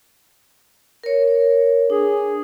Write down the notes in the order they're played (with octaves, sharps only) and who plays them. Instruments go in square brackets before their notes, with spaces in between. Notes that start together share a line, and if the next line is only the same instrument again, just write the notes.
[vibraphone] A#4 C#5
[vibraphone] D4 [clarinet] G#4